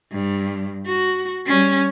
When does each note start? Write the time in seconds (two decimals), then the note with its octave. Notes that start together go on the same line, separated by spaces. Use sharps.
0.12 G2
0.86 F#4
1.47 G3 C#4